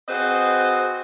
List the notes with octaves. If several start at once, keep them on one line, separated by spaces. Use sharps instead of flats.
C4 F#4 G#4 B4 C5 D#5